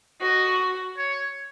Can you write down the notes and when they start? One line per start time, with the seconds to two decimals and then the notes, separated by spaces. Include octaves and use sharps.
0.21 F#4 D#5
0.97 C#5